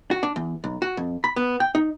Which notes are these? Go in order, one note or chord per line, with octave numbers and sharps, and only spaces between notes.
F#4
D4
E2
B1
F#4
F2
B5
B3
G5
D#4